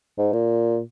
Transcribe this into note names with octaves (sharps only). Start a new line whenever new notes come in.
G#2
A#2